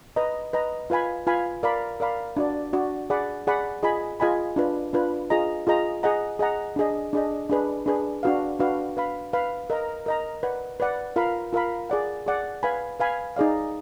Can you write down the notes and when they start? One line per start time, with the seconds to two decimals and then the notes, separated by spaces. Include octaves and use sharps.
0.16 B4 D#5 A#5
0.53 B4 D#5 A#5
0.90 F4 B4 F5 G#5 B5
1.27 F4 B4 F5 G#5 B5
1.63 A#4 D5 F5 B5
2.00 A#4 D5 F5 B5
2.37 D4 F#4 D5
2.73 D4 F#4 D5
3.10 G#4 D5 F#5 B5
3.47 G#4 D5 F#5 B5
3.83 F4 G#4 D#5 G#5 B5
4.20 F4 G#4 D#5 G#5 B5
4.56 D4 F4 B4
4.93 D4 F4 B4
5.30 F4 G#4 D#5 A#5
5.67 F4 G#4 D#5 A#5
6.03 G#4 D#5 F#5 A#5
6.39 G#4 D#5 F#5 A#5
6.76 D4 G#4 D#5
7.13 D4 G#4 D#5
7.50 D4 G#4 B4
7.86 D4 G#4 B4
8.23 D4 F#4 B4 F5
8.59 D4 F#4 B4 F5
8.97 B4 F5 B5
9.33 B4 F5 B5
9.70 A#4 D#5 A#5
10.06 A#4 D#5 A#5
10.43 B4 D5 F#5
10.80 B4 D5 F#5
11.16 F4 A#4 F5 B5
11.53 F4 A#4 F5 B5
11.90 G#4 D5 F#5
12.26 G#4 D5 F#5
12.63 B4 F5 G#5 B5
13.00 B4 F5 G#5 B5
13.36 D#4 G#4 D5 F5